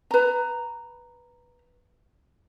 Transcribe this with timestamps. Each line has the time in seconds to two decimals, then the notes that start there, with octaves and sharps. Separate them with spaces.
0.11 B4 A#5